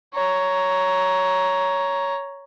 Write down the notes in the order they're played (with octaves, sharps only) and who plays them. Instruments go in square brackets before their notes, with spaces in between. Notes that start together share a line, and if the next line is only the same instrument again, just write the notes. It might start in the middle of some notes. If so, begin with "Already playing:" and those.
[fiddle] C#5 A#5